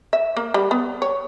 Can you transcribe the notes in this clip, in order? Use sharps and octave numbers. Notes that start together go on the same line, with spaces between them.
E5
A#3
G3
B3
C#5